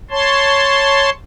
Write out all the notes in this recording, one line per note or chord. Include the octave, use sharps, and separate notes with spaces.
C#5 A5 C6